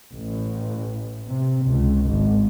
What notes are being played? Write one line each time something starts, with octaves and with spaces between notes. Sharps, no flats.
A1
C3
C#2
G#1